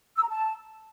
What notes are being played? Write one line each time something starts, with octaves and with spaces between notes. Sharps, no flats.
E6
A#5
A5